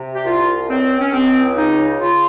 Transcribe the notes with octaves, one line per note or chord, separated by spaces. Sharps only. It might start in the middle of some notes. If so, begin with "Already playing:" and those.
Already playing: C3
G4
C2 F4
C#2 C4
C#4
C#2 C4
C#3 D#4
C#3 F4